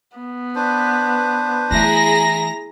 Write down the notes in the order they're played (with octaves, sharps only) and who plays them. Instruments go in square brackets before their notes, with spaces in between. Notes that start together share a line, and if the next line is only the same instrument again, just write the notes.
[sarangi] B3
[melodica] D4 B4 C5
[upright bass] E3 A3 [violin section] E4 G#4 A#6 [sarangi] A#5